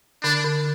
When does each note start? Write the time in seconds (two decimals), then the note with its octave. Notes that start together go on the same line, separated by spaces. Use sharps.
0.23 D3 D4
0.44 D3